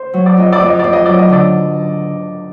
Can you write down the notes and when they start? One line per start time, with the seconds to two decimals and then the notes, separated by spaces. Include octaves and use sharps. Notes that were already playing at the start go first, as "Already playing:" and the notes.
Already playing: C5
0.14 F#3
0.26 D5
0.37 F2 D#5
0.52 D5
0.61 F2
0.66 D#5
0.79 F2 D5
0.93 D#5
1.06 F#3 D5
1.19 D#5
1.30 D3 D5